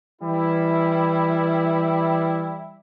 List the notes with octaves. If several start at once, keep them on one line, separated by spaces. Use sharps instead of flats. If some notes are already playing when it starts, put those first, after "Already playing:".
E3 G3 E4